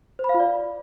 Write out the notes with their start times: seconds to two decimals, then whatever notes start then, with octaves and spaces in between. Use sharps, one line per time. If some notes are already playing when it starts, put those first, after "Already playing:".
0.19 C5
0.24 B5
0.29 F5
0.34 F4
0.40 D5